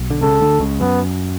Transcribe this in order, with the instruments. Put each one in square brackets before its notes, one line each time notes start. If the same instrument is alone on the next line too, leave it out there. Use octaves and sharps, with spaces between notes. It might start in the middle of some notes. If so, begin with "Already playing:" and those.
Already playing: [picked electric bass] B1 B2
D3
[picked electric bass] C#2 C#3 [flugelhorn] A4
[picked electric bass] D2 D3
C#2 C#3
[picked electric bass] F#2 [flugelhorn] B3